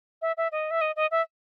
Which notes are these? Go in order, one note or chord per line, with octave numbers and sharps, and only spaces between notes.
E5
E5
D#5
E5
D#5
D#5
E5